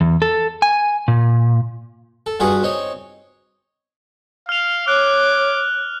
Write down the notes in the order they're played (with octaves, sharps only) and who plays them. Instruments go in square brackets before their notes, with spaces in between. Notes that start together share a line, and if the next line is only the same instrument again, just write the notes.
[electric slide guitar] E2
A4
G#5
A#2
[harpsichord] A4
G2 F4 F#4 G#4 B4 F#5
C4 D#4 C#5
[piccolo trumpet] F5 [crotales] F6 F7
[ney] C#5 [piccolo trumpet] D6 [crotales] F#6